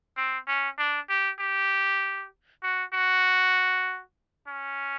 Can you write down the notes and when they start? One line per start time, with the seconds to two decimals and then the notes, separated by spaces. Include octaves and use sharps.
0.17 C4
0.48 C#4
0.78 D4
1.09 G4
1.39 G4
2.63 F#4
2.93 F#4
4.47 C#4